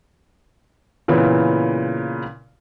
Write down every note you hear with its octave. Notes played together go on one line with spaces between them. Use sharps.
A#2 C#3 E3 B3 E4